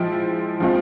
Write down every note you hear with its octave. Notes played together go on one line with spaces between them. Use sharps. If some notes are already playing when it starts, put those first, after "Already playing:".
Already playing: F3 G#3 E4 G5
F3 G#3 C4 F4